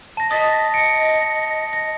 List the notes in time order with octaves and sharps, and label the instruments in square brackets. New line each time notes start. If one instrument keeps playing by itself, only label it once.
[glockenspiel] A5 A#6
[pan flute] D#5 [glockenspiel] D#6 A6 B6
[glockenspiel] A#6 C#7 D7
A#6